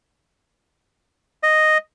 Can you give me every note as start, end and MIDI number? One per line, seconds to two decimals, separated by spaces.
1.43 1.78 75